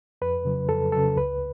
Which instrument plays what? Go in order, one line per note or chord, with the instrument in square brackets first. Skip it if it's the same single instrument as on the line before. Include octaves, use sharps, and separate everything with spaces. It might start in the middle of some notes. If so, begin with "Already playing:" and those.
[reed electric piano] F2 B4
C#3 F#3
F2 A4
C#3 F#3 A4
C#2 B4